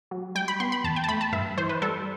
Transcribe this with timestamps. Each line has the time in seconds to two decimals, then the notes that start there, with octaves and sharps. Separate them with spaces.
0.11 F#3
0.35 G3 G5
0.48 B5
0.60 B3 C6
0.72 B5
0.84 E2 A5
0.96 G5
1.04 A5
1.08 A3 B5
1.21 A5
1.32 G2 E5
1.58 E3 C5
1.69 B4
1.82 G3 A4